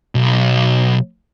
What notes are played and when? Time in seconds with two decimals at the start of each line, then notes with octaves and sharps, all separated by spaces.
0.15 B1